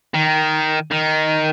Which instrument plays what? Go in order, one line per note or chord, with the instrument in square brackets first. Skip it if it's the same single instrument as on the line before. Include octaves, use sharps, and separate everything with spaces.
[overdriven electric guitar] D#3
D#3